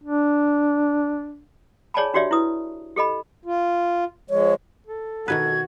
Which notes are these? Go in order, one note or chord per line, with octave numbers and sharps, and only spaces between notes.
D4
G#4 C#5 D5 G#5 A5 B5
D4 F#4 G4 C#5 D5 E5
E4 B4 D#6
G4 A4 D#5 B5
F4
F3 G#3 C#5
A4
B2 D#3 F#4 B4 G#6